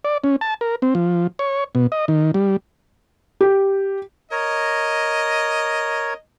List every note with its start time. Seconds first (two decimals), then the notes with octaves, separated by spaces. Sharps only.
0.05 D5
0.24 C#4
0.41 A5
0.61 A#4
0.82 C4
0.95 F3
1.39 C#5
1.75 B2
1.92 D#5
2.08 D#3
2.34 G3
3.41 G4
4.31 A#4 C#5 D#5